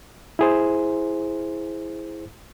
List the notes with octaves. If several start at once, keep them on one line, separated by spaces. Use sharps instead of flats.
E4 G#4 C5